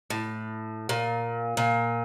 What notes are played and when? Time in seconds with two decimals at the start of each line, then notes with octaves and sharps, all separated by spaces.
0.10 A2
0.89 A#2
1.57 A#2